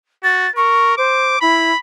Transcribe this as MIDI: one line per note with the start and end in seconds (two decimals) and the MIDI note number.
0.23 0.47 66
0.23 0.50 93
0.56 0.96 70
0.56 0.93 85
0.97 1.36 72
0.97 1.41 86
1.41 1.71 64
1.41 1.77 83